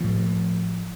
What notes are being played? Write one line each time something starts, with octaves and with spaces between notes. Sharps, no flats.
A2 F3